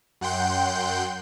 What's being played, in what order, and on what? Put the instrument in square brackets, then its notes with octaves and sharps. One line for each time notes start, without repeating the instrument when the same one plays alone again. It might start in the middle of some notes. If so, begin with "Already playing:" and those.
[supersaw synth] F#2 F#5 G5 C6 G6